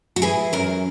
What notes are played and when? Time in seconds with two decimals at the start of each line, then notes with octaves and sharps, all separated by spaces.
0.16 F#4
0.22 E3 G#4
0.53 F#2 A#4